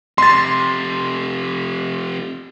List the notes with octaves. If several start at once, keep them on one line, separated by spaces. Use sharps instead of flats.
F2 C3 C6 A6